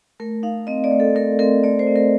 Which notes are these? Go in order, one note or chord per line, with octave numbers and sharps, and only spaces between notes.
A3 A#4
D#4 F5
C4 D#5
D5
A3
A4
A3 A#4
C4 A#4
A3 D5
C5
C4
A#4